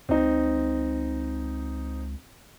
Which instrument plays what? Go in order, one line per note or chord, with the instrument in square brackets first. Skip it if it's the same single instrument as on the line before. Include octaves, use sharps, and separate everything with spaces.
[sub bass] C#2 [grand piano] C4 D#4